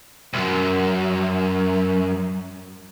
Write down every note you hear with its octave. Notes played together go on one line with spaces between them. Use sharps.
C2 F#2